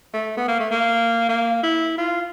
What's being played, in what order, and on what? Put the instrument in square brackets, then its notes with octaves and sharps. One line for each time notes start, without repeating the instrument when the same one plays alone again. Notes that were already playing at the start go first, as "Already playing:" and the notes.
[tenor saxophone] A3
B3
A#3
A3
A#3
A#3
E4
F4